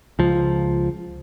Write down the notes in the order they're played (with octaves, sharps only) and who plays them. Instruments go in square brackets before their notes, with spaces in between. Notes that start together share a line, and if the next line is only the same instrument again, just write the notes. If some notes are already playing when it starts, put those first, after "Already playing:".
[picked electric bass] C#2 F3